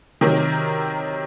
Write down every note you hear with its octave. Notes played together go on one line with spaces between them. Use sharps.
C3 D#3 F#3 A#4